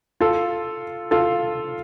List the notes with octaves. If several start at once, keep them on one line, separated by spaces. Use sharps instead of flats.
F4 A4
F4 A4